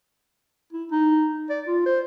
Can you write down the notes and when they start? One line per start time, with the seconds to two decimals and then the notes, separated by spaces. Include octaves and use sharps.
0.73 E4
0.91 D#4
1.50 D5
1.67 F4
1.86 C5